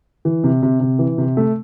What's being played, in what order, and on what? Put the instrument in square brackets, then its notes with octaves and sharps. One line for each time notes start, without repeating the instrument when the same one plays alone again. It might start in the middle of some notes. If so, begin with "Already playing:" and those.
[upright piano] E3
C3
C3
C3
E3
C3
A3